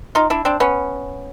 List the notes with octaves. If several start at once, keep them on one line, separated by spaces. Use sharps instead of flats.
D#4 F4
D4 E4
C4 D4
B3 C#4